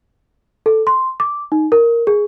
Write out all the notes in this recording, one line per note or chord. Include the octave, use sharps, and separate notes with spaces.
A4
C6
D6
D#4
A#4
G#4